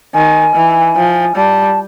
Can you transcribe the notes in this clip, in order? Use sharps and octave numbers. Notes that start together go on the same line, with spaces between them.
D#3 G#5
E3
F3
G3 A5